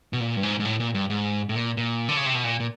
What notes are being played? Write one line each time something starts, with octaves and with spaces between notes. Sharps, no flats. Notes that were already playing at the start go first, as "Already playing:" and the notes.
B2
A#2
G2
G#2
G#2
A2
A#2
G2
G#2
A2
A#2
A#2
D3
C#3
C3
B2
A#2
A#2